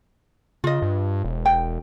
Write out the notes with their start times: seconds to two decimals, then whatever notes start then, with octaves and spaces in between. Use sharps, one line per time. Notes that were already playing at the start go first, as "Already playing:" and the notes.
0.64 C#3 F4 D#5
0.82 G2
1.25 E1
1.46 G5